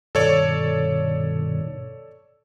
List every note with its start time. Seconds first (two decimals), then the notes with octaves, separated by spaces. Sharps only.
0.15 G2 B2 D#3 A4 C#5 D5